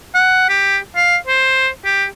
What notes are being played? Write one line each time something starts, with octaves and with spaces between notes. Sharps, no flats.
F#5
G4
F5
C5
G4